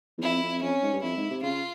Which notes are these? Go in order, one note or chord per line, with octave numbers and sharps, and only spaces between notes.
E2
F2 E4
F2
F2 C#4
G#2
G2
F2 E4
G#2
C3
C#3 F4